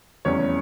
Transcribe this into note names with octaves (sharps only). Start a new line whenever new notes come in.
F1 E2 E3 G3 C#4 C#5